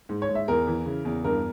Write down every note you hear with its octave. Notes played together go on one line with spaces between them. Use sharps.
G#2
C#5
G#2
E5
E2 A#4
E3
C#3
E2
G2 A#4